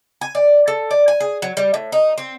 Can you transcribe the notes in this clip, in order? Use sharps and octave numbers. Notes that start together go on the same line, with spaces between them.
G#5
D5
A4
D5
G#5
G#4
F#3
G3
A2
D#4
C4